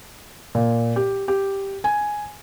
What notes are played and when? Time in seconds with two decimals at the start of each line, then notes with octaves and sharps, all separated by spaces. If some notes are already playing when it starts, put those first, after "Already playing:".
0.55 A#2
0.96 G4
1.28 G4
1.84 G#5